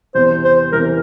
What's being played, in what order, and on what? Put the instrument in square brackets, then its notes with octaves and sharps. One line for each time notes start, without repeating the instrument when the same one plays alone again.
[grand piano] E2 C3 E3 [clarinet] C5
[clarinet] C5
[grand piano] E2 C3 E3 [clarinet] A#4